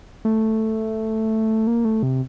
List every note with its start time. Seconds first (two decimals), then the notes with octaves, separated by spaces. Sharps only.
0.25 A3
1.67 A#3
1.85 A3
2.03 C3